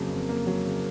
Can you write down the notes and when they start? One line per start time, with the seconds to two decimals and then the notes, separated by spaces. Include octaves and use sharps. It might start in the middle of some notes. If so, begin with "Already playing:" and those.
Already playing: F2 C#3 F#3 A#3
0.12 F2
0.29 A#3
0.47 F#3
0.66 C#3